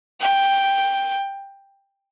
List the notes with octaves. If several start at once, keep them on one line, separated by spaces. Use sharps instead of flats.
G5